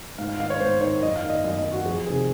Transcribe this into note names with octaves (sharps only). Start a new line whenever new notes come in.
G#2 F5
F5
D#3 F5
C#5
G#2 C5
D#3 C#5
F#2 D#5
F5
D#3
D#5
F#2 D#5
D#5
D#3
F#4
F2 G#4
C3 D#3 G#4